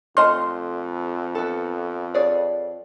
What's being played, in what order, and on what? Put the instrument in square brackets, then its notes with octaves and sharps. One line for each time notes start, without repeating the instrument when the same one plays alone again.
[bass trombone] F2 [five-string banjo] A3 D#5 A5 [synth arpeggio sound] C6 F6
[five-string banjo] B3 A4
G#4 C#5 D5